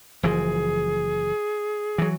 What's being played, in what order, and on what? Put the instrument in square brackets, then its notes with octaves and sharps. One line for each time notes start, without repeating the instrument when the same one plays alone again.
[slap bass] F#1 E3 F3 [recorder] G#4
[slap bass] E3 F#3